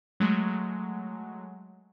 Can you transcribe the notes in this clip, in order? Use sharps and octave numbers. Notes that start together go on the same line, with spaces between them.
F#3 G#3 A3